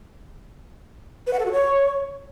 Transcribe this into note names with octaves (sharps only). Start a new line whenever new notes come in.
B4
F#5
A4
F#4
C#5